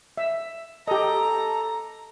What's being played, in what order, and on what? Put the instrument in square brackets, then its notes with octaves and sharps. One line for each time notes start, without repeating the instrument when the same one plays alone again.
[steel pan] E5
[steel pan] G4 D#5 [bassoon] A4 [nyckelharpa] A#5